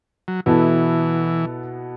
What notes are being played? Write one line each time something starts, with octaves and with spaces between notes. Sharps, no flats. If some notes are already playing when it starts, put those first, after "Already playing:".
F#3
B2 E3 B3 E4 A4